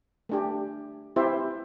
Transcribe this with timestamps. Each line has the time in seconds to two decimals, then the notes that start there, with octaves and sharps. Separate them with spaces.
0.29 A3 D4 G4
1.16 C4 E4 G4 C5 E5